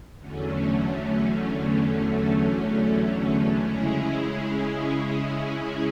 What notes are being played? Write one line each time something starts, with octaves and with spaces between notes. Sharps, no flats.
E2 D3 F#3 A3 C#4
C#3 G#3 C#4 E4 G#4